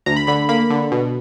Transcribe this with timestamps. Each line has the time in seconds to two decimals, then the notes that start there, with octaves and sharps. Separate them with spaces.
0.06 D2 A#5
0.16 B5
0.27 D3 B5
0.49 A#3 B5
0.70 D3
0.92 B2